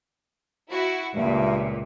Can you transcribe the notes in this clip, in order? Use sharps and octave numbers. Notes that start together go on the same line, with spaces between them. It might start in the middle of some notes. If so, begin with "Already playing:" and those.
E4 F#4
C#2 G2 A#2 E5